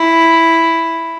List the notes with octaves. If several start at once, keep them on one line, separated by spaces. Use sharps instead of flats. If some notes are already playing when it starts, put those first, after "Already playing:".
Already playing: E4